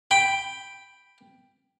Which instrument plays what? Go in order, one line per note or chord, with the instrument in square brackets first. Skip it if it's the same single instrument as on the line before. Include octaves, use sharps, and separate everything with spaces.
[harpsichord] G5 B5